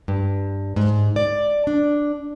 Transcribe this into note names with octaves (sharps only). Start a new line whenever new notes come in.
G2
G#2
D5
D4